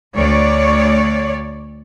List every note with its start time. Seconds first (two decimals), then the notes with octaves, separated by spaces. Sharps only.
0.15 D2 C#5 D5